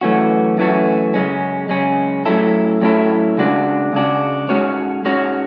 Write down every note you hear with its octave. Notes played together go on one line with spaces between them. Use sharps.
F#2 E3 A3 C#4 F#4
F#2 E3 A3 C#4 F#4
F#2 C#3 G#3 C#4
F#2 C#3 G#3 C#4
A2 F#3 C#4 E4 A4
A2 F#3 C#4 E4 A4
C#3 G#3 D4 F#4
C#3 G#3 D4 F#4
G#2 G#3 C#4 F#4 C#5
G#2 G#3 C#4 F#4 C#5